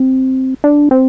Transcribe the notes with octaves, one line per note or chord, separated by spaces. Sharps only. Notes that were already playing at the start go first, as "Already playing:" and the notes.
Already playing: C4
D4
C4